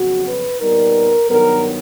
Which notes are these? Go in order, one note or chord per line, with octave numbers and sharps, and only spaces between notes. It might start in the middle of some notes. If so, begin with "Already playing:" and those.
Already playing: F2 C#3 F#3 B3 F#4
B4
A#2 G3 B3 D#4 A#4
G2 D#3 F#3 B3 A#4